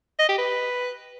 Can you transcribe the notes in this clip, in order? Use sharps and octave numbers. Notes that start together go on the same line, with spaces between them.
D#5
G4
B4